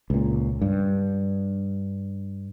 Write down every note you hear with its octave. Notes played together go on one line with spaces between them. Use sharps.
C#2 A#2
G2